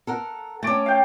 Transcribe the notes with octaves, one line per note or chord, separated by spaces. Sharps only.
A4 A#4 F#5
A3 C#4 A5 D6
F5 G5